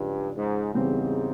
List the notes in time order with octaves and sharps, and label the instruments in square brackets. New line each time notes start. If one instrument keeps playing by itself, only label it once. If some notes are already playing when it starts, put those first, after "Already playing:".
Already playing: [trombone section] G2 [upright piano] C#3 F3 G#3
[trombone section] G#2
[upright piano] E2 C#3 E3 G3 C4 [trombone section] G#2